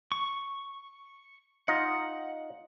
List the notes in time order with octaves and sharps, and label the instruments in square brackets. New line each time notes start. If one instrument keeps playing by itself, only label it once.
[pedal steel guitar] C#6
[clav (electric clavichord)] D#4 F4 D#5 [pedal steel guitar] F#5